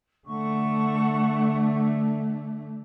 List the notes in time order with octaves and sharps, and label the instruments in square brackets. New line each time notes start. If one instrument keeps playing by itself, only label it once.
[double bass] D3 A3 [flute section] A4 F#5 C#6